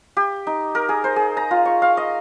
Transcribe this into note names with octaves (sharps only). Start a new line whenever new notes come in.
G4
D#4
A#4
G#4
C5
G#4
A#5
F4
C#6
F5
D#5